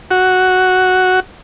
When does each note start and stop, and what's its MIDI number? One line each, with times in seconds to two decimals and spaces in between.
0.11 1.20 66